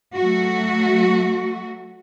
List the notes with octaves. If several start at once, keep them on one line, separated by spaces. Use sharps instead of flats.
F#3 A3 F#4